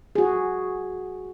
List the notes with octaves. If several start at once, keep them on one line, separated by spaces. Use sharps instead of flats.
F#4 G#4